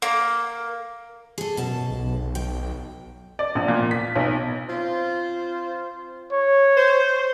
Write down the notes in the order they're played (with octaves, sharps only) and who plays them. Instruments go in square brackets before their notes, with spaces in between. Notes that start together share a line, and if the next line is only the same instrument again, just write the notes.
[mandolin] A#3
[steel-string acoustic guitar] G#4 A4
[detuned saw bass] F#2 [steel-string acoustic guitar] B2 A5
[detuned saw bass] B1
[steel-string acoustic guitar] G5
[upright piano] D5
A#1
A#2
B6
B1
[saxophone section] C4 F4 C5
[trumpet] C#5
[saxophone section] C5